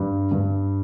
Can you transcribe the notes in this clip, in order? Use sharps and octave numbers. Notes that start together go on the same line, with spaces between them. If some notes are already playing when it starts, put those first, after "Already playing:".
Already playing: G2
G2